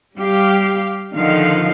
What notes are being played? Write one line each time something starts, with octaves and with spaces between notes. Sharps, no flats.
G3 G4 F5
D3 D#3 F3 D#4 F5